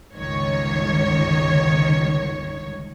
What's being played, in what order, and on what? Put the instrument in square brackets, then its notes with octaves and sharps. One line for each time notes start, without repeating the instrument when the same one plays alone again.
[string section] G1 C#2 D#3 C#5